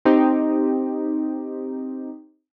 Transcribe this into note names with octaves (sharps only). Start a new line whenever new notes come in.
C4 D#4 G4